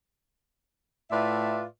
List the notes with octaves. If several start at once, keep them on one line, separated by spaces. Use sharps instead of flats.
A2 F4 B4 D5 E5